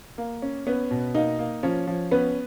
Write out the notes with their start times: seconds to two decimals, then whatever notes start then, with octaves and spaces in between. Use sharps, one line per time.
0.18 A#3
0.42 C#4
0.67 B3 C#4 B4
0.91 B2
1.15 A#3 D#4 D#5
1.39 A#3
1.63 F3 C#4 C#5
1.87 F3
2.11 B3 C#4 B4